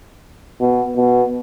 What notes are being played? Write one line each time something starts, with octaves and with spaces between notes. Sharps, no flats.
B2
B2